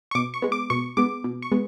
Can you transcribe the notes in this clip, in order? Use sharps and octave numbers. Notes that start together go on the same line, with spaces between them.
C#6
B2 D6
C#6
G#3 B3
D6
B2 C#6
G#3 B3 D6
B2
C#6
G#3 B3